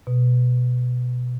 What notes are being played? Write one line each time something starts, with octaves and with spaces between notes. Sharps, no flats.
B2